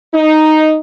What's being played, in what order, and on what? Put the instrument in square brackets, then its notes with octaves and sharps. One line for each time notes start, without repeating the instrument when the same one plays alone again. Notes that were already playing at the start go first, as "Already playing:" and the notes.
[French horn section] D#4